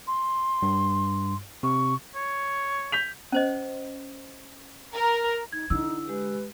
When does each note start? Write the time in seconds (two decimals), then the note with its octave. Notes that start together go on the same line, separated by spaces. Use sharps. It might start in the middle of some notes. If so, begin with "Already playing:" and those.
0.07 C6
0.62 G2
1.63 C3 C#6
2.15 C#5
2.92 G6 B6 F7
3.32 C#4 C5 D#5
4.95 A#4
5.52 D#4 G#6
5.70 D3 D#4 E4 E6
6.07 G#3 G4 B4